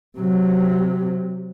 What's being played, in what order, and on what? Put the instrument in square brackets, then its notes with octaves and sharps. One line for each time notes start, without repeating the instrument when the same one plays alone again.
[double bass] C3 F#3